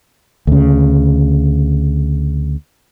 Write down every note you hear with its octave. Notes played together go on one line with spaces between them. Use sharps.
D2 C#3